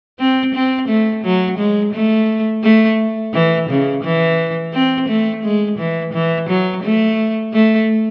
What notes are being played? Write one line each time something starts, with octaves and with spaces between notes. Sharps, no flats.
C4
C4
A3
F#3
G#3
A3
A3
E3
C#3
E3
C4
A3
G#3
E3
E3
F#3
A3
A3